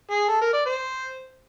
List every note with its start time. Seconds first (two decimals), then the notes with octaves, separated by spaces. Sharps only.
0.11 G#4
0.28 A4
0.41 A#4
0.53 D5
0.66 C5